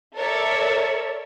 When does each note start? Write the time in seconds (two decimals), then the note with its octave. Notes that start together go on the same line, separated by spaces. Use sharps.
0.15 A4 A#4 C#5 D5 E5